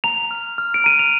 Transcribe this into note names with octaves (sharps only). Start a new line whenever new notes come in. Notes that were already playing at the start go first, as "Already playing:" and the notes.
A#5 F7
F6
F6
D7
A#5 D#7
F7